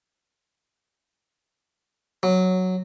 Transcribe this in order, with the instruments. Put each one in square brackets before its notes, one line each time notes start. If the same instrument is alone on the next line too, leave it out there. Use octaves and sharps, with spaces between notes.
[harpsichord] F#3